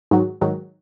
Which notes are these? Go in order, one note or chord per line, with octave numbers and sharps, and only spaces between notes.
G#2 D#3 F#3
G#2 D#3 F#3